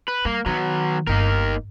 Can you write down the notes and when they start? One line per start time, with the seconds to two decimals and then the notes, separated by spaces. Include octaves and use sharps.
0.08 B4
0.25 G3 A#3
0.46 D#3 F#3 B3
1.07 G1 A#3 D#4 A#4